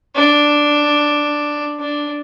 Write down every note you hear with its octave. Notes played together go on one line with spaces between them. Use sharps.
D4
D4